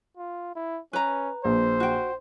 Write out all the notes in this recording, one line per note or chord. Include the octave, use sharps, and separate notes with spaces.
F4
E4
C#4 B4 A#5
A#1 C5
F#4 G5